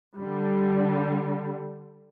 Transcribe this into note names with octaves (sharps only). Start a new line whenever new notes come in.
D3 G3